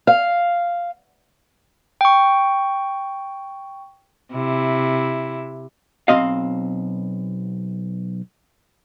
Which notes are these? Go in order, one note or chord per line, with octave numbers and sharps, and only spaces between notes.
F5
G5 C#6
C3 E4
B1 G#2 C4 D#5 F5